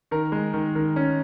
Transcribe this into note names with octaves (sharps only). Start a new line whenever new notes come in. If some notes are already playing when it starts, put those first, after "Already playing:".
D#3 A#4
G#3
D#3
D#3
C#4